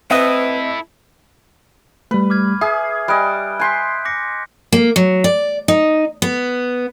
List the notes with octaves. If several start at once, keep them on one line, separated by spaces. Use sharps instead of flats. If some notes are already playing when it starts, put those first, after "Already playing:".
C4 E4 A4 B4 D#5 E5
G3 A3 B4
D6 F6 G#6
G#4 E5 D#6
G3 D#5 G#5 F#6 D7
G#5 C6 F#6 G6 B6
D6 A#6 C#7
A#3
F#3
D5
D#4
B3